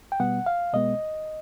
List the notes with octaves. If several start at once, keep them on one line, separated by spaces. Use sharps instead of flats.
G5
B2 G3 B3 F#5
F5
B2 G#3 B3 D#5